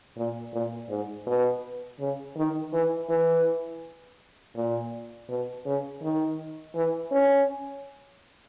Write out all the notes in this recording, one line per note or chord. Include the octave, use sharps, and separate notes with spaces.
A#2
A#2
G#2
B2
C#3
D#3
E3
E3
A#2
B2
C#3
D#3
E3
C#4